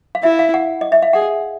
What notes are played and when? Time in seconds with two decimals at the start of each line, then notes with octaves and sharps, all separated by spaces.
0.15 F5
0.23 E4 E5
0.39 F5
0.54 F#5
0.81 D#5
0.92 E5
1.02 F5
1.13 G#4 F#5